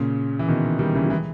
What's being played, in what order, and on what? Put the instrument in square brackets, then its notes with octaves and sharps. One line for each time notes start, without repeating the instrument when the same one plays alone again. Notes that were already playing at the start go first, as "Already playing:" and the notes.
Already playing: [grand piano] A#2 C#3
E3
B2 D#3
D#3 G3
C#3 E3
G3
E3 G#3